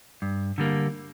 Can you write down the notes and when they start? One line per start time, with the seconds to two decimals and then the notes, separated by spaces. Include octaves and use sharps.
0.22 G2
0.58 D3 G3 A#3